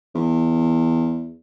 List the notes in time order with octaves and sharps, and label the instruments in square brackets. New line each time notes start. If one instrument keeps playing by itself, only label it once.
[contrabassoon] E2